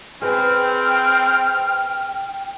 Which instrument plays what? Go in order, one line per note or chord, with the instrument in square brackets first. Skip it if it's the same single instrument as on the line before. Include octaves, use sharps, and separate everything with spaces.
[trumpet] C4 [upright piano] G#4 B4 [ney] G5 [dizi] F6